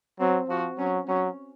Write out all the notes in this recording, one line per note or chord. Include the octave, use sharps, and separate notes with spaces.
F#3 C4
F3 F#4
F#3 C#4
F#3 C#4